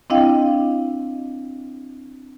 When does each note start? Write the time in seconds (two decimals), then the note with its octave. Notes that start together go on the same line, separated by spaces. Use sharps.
0.10 C4 D4 E4 D#5 F5 G5